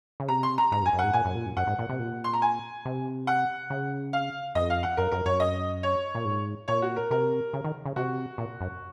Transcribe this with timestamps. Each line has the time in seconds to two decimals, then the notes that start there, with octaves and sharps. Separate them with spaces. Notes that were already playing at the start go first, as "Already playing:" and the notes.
0.20 C#3
0.29 C3 A#5
0.43 C6
0.58 A#5
0.72 G#2 A#5
0.82 F#2
0.86 G#5
0.93 F#2
0.99 G#2 F#5
1.13 A#2 G#5
1.25 F#2
1.35 A#2
1.46 F#2
1.56 F#2 F#5
1.67 G#2
1.79 A#2
1.89 C3
1.99 A#2
2.24 C6
2.33 A#5
2.42 G#5
2.85 C3
3.27 F#5
3.70 C#3
4.13 F5
4.55 F2 D#5
4.70 F5
4.83 F#5
4.97 F#2 A#4
5.11 F#2 A#4
5.26 F#2 C#5
5.40 D#5
5.83 C#5
6.15 A#2
6.25 G#2
6.68 A#2 C#5
6.82 F#4
6.96 A#4
7.11 C3 A#4
7.53 C#3
7.64 D#3
7.85 C#3
7.96 C3 F#4
8.38 A#2
8.61 F#2